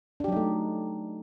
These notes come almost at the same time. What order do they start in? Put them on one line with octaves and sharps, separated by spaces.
D4 G4 F#3 D#4 A3